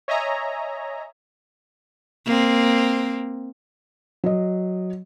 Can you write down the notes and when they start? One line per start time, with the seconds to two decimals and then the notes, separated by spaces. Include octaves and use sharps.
0.08 C#5 D#5 E5 G#5 A#5
2.26 A#3 C4
4.24 F#3 D#5